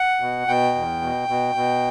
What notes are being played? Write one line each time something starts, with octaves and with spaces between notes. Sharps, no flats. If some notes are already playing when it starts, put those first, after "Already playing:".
Already playing: F#5
B2
B2 G5
E2
B2
B2
B2